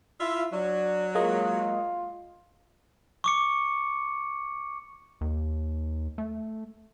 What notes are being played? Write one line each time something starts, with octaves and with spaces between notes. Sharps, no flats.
E4 F4 E5
F#3 D4
G#3 A#3 F4 D#5
C#6 D6 C#7
D#2
A3